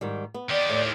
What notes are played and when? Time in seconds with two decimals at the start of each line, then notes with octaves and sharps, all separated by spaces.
0.01 G#2 D#3 G3
0.34 B3
0.50 D#3 G4 D5
0.69 A2